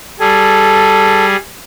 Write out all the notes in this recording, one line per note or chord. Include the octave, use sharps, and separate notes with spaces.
G3 G#4 A4